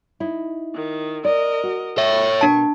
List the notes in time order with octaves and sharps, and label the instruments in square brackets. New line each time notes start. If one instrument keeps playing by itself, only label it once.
[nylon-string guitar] D#4 E4
[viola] D#3
[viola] A#4 D#5 [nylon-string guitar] D5
[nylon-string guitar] F#4
[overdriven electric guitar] C#5 E5 [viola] C#6
[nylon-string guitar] B2 A#3 [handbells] D4 A5